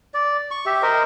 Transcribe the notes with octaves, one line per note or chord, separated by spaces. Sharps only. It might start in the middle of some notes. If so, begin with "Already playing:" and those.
D5
C#6
G4 E5
A#4 C5 D#5